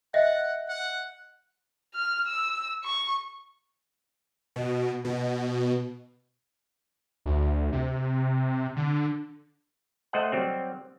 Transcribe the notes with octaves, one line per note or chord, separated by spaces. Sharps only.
D#5 E5 F#5
F#5
F6
E6
C#6
B2
B2
D2
C3
D3
A3 C5 D#5 F#5
F#3 G3 C4